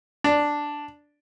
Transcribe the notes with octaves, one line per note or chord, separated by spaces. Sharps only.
D4